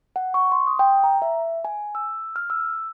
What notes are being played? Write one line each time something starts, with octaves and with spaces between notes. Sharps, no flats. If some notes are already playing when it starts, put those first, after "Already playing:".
F#5
C#6
C6
D#6
G5
A#5
E5
G#5
E6
F6
E6